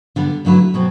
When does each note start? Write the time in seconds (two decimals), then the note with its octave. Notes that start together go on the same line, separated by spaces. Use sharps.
0.16 D3 G3 B3
0.45 D3 F#3 A3 E4 B4
0.74 B2 F#3 C4